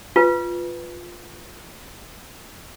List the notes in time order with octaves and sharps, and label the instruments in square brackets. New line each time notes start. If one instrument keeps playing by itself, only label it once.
[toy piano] F4 B4